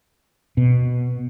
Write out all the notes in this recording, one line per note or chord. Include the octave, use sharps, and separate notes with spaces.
B2